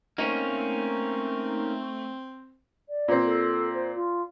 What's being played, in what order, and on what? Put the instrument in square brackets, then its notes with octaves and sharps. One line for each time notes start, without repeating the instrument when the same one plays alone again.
[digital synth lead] A3 [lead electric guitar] A#3 C#4 [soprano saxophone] C4 [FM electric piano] D#4
[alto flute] D5
[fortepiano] A#2 C4
[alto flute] A4
C5
F4